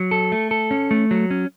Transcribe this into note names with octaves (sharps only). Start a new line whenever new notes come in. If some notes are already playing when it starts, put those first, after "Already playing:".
Already playing: F#3
A4
A3
A4
C#4
A3
F#3
C#4